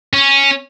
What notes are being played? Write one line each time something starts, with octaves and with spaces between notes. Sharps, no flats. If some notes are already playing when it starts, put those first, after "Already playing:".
C#4